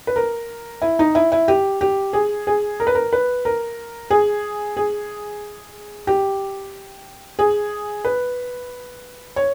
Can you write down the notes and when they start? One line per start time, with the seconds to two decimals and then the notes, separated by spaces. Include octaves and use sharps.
0.07 B4
0.16 A#4
0.82 E4
0.99 D#4
1.15 E4
1.32 E4
1.48 G4
1.81 G4
2.13 G#4
2.47 G#4
2.80 A#4
2.87 B4
2.95 A#4
3.13 B4
3.45 A#4
4.10 G#4
4.77 G#4
6.07 G4
7.39 G#4
8.05 B4
9.36 C#5